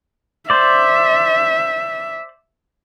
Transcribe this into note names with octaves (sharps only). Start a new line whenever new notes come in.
C5 D5 E5